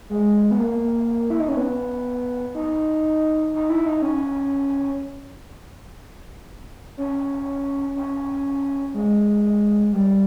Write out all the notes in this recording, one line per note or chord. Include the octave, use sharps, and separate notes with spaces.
G#3
B3
A#3
E4
D#4
C#4
B3
D#4
D#4
E4
D#4
C#4
C#4
C#4
G#3
G3